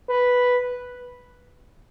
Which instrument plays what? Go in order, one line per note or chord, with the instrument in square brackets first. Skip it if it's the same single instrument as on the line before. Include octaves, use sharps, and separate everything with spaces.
[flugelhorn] B4